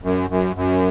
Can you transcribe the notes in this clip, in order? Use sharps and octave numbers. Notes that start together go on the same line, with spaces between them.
F#2
F#2
F#2